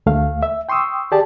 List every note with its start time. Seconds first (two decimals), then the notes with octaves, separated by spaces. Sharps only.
0.06 D2 A3 F5
0.43 E5
0.69 G5 C6 C#6 D#6 E6
1.12 G4 G#4 D5 A5